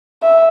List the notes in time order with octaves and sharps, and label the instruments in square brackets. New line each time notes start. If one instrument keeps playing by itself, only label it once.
[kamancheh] E5